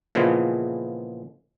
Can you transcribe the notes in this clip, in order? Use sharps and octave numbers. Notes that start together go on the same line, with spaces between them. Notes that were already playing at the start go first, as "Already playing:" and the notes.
A#2 C#3 E3 F3 G#3 B3